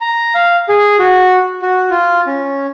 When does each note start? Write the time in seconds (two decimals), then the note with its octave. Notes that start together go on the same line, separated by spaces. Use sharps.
0.01 A#5
0.35 F5
0.69 G#4
0.99 F#4
1.62 F#4
1.90 F4
2.27 C#4